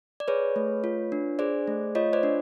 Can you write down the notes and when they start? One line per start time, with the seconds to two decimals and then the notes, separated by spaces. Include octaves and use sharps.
0.20 D5
0.28 G#4 B4 C#5
0.56 A3
0.84 F4
1.12 D4
1.39 G#4 C5 D5
1.68 A3
1.95 F4 C#5 D#5
2.13 C5 D5
2.23 D4